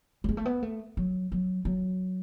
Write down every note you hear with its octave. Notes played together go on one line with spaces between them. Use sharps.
A3
G#3
A3
B3
A3
F#3
F#3
F#3